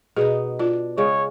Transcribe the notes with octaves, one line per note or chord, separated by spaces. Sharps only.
B2 B3 D#4 G#4
D4 F4
C#3 G#3 C#5